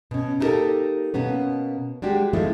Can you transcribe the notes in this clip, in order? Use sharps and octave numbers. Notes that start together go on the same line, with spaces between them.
B2 C#4
A#3 D#4 E4 G4 A4 A#4
B2 A#3 B3 C#4
G3 G#3 D4 F#4 G4
F3 G#3 A3 C4 D#4 E4